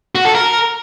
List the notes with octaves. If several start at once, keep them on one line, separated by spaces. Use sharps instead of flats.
F#4
A4
A#4